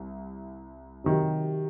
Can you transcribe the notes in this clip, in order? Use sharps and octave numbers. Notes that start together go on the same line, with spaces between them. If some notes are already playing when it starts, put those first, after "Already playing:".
Already playing: C2
C3 D#3 F#3